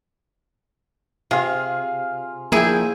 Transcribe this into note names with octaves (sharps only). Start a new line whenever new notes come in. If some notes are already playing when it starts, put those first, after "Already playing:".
C3 F4 G#4 F5
F3 A#3 E4 G#4 E5 G5